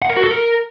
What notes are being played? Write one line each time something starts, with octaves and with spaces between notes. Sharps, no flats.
F#5
A#4
F#4
A4
A#4